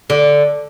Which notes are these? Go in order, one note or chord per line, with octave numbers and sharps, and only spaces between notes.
D3